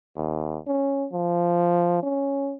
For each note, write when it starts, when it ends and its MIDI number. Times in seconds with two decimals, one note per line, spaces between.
0.16 0.58 39
0.67 1.07 61
1.12 2.01 53
2.03 2.55 61